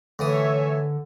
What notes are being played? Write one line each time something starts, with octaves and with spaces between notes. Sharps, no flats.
A2 D3 E3 C#5 E5 G#5 D#6